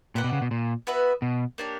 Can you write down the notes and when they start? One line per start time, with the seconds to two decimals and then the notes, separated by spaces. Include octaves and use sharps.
0.15 A#2 G4 B4 D5 F#5
0.24 B2
0.33 C#3
0.42 B2
0.51 A#2
0.87 B3 F#4 B4 E5
1.22 B2
1.58 A#3 D4 G4 C#5